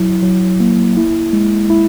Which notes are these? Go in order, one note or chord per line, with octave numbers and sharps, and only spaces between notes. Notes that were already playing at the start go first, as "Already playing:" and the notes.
Already playing: F#3 E4
F#3
A#3
E4
G#3
E4